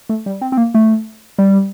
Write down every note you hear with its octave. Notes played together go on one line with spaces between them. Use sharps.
A3
G3
C4
C4
A#3
A3
G3